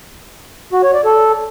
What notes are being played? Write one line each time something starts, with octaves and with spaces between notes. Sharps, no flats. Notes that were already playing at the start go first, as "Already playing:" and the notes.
F#4
C#5
D5
A4